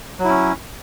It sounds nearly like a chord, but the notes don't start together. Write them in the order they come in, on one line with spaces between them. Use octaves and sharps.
F#3 E4 C#4